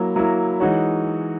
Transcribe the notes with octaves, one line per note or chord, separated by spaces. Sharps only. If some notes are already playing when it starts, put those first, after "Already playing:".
Already playing: F#3 A#3 E4 A#4
F#3 A#3 E4 A#4
E3 G#3 D#4 F#4 C#5